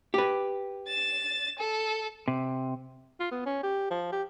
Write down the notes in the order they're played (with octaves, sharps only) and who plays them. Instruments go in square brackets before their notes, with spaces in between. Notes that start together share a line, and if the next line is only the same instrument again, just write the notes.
[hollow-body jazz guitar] G4 B4
[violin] A6 E7
A4
[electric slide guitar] C3
[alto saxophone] F4
B3
C#4
G4
F3
G4